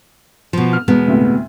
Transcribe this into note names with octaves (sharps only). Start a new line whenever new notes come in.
B2 F3
F6
E2 B2 G#3 B3
D2 A2 C3